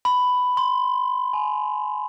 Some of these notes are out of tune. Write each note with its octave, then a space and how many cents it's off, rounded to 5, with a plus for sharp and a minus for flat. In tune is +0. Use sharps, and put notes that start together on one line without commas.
B5 +10
C6 -5
G#5 +30